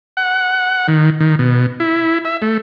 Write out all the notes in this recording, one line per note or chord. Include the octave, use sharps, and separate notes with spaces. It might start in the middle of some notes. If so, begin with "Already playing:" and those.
F#5
D#3
D#3
B2
E4
E5
A3